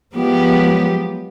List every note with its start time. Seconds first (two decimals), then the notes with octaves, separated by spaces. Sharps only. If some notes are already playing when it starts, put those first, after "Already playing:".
0.14 F3 F#3 G#3 B3 G4